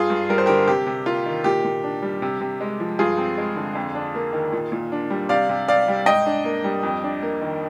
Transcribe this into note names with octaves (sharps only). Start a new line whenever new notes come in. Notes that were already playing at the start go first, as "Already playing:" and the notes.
Already playing: G2 F4 G#4
G2
G3 A#4
C5
D3 G4 A#4
C3 G4
C3
A#3 F4
D#3
A#2 G4
A#2
D4
G3
C3
C3
G#3
F3
G2 F4 G#4
C4
G#3
D3
F2
D4
A#3
D#3
A#2
A#2
D4
G3
C3 D5 F5
C3
C4 D5 F5
G3
G#2 D#5 G5
D4
A#3
G3
F2
D4
A#3
D#3